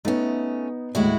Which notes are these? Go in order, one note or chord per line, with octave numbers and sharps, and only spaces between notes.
A3 B3 C#4 D#4
D#2 A2 G#3 E4 F#4